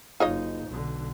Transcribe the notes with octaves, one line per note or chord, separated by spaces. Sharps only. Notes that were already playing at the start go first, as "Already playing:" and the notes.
F#1 D#4 F4 C#5 D#5
B1 D3